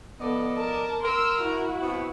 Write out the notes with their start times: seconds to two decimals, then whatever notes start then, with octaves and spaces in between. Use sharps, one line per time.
0.20 F3 B3 A4 D5 D#5
0.58 A#4 A5
1.04 A#4 C6 E6
1.41 E4 F#4
1.82 B2 B3 C4